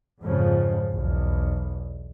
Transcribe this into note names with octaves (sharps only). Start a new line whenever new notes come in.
F2 G#2 C#3 F3
B1 E2